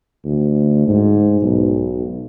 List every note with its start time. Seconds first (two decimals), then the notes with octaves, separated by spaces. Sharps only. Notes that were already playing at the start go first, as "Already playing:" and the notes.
0.24 D2
0.88 G#2
1.42 B1